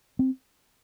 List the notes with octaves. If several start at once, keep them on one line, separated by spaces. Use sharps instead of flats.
C4